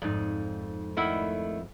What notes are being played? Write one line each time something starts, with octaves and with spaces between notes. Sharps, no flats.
F2 G#2 D#4 D5
D#3 A3 E4 D5 F#5